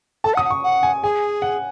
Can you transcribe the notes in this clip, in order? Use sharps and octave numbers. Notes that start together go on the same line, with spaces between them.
A4 A5
F#5
D#6
F#5
C#6
F#5
G#5
G#4 G#5
F#5